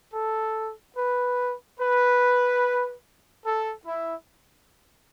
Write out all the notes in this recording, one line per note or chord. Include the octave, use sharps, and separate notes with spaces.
A4
B4
B4
A4
E4